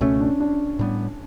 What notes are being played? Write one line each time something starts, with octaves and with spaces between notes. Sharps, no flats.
C#2 B2 A3 C#4
D4
D4
A2 G3 B3